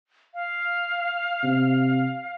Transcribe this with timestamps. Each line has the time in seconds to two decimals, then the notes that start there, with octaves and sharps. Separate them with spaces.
0.34 F5
1.44 C3